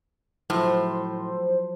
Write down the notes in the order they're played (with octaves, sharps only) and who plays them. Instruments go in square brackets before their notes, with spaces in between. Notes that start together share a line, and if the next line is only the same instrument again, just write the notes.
[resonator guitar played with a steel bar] A2 [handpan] F3 F#3 [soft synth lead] C5